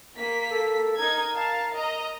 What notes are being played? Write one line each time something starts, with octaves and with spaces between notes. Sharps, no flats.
A#3 B6
A4
D#4 A#4 G#6
F5 A5
D#5 A#5